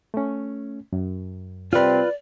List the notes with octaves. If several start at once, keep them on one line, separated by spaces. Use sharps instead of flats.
A3 C#4
F#2
C3 G3 C4 F4 B4 D5